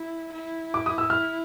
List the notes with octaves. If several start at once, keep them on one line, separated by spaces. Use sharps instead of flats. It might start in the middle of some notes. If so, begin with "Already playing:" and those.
Already playing: E4
E4
D6
D#6
E6
F6